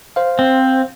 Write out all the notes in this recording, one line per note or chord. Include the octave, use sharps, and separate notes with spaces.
C5 F5
C4